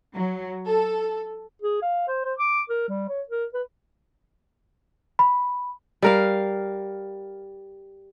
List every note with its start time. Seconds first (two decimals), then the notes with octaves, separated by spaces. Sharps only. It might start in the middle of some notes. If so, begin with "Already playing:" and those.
0.12 F#3
0.65 A4
1.62 G#4
1.82 F5
2.08 C5
2.25 C5
2.39 D6
2.70 A#4
2.89 G3
3.09 C#5
3.29 A#4
3.54 B4
5.19 B5
6.02 G3 A#4 F5